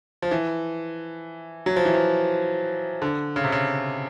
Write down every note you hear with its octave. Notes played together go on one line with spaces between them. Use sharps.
F3
E3
F#3
F3
E3
F3
D3
C#3
C3
C#3